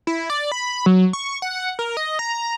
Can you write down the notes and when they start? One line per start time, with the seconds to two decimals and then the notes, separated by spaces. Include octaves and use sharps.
0.07 E4
0.30 D5
0.52 B5
0.86 F#3
1.13 C#6
1.42 F#5
1.79 A#4
1.97 D#5
2.19 A#5